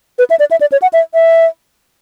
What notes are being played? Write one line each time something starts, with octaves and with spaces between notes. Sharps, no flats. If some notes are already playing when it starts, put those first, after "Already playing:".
B4
E5
D5
E5
D5
C#5
F#5
E5
E5